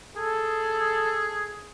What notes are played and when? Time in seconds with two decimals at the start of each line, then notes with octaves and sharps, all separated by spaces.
0.16 G#4 A4